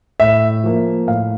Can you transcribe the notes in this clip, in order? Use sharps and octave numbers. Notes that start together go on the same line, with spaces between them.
A2 E5
F3 A#3
A2 F5